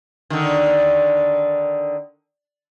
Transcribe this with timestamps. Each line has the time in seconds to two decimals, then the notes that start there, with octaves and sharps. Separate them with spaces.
0.30 D3 D#3